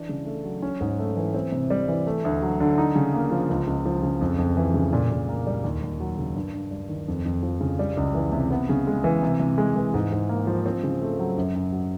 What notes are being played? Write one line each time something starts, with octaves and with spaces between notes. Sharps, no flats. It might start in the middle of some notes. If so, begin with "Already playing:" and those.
Already playing: E3 D4
C#3
A3
F#3
C#4
G#2
A3
E3
C4
C3
G3
E3
A3
D2
F#3
D3
D#4
C#3
A#3
F3
C#2
C#2
F3
C#3
F2
F2
E3
C#3
A#2
A#2
A#3
G3
D#2
D#2
F#3
C#3
G2
G2
G3
D#3
F2
F2
F3
C#3
G3
C#2
E3
C3
B3
C#3
G#3
E3
C3
C3
G#3
E3
G#2
G#2
A#3
F3
C4
C#3
A3
F#3
F#2
F#2
F#3